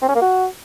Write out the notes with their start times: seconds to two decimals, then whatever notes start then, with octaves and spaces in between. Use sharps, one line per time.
0.02 C4
0.09 C#4
0.15 A#3
0.21 F#4